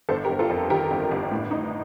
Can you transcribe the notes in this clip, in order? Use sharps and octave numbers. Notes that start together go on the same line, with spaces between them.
G1 A4 C5
G4 A#4
G1
F4 A4
F2
D#3 G4 A#4
G1
G1
A2
D#4